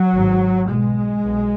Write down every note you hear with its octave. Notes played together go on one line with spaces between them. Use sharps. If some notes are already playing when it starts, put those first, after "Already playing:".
Already playing: F#3
G#1 G#2
B1 B2 G#3
B1 B2